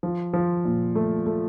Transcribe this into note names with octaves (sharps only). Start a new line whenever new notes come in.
F3
F3
A#2
A3
A3